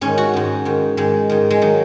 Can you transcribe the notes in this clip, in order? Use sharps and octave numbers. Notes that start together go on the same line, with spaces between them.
G#2 D#3 C#4
F#4
G#2 D#3
G#2 D#3
G#2 D#3 G#3
G#2 D#3
G#3
D#3 F#3